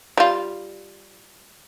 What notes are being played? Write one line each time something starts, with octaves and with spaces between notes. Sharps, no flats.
G3 F4